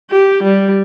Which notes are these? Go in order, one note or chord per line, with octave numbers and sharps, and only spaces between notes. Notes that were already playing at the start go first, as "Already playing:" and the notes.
G4
G3